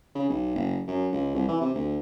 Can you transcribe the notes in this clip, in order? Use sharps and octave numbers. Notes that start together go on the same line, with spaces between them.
C#3
B1
F#1
F#2
C#2
C2
E3
C3
D2